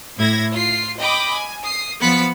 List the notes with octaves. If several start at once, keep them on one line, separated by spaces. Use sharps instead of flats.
A2 E4 G#6 A#6
F4 C7
D#5 G5 B5 D6
G#5
D#6 C7
F3 B3 B5 A6 B6 C#7